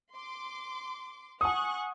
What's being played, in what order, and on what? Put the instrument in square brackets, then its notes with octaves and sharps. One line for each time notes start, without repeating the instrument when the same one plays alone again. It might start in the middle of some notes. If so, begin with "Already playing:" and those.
[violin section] C6 D6
[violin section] F#5 C#6 F#6 [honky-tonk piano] G#5 D#6